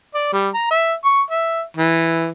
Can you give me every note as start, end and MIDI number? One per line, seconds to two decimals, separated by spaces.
0.14 0.30 74
0.33 0.49 55
0.54 0.67 82
0.70 0.93 76
1.04 1.21 85
1.31 1.61 76
1.77 2.28 52